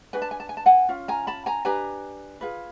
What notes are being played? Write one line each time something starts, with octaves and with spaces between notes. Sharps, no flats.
D4 F#4 B4 G#5
A5
G#5
A5
G#5
A5
F#5 G#5
C#4 F4
G#5 A#5
A5 B5
G#5 A#5
D4 G4 B4 G#5 A#5
F4 G#4 B4